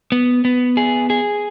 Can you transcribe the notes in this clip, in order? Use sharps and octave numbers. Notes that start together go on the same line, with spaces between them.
B3
B3
G#4
G#4